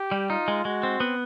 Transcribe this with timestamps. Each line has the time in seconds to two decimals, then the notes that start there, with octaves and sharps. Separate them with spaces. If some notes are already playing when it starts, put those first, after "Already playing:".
Already playing: G4
0.12 G3
0.30 D#4 F4
0.48 G#3
0.65 G#3 F#4
0.83 C4
1.00 B3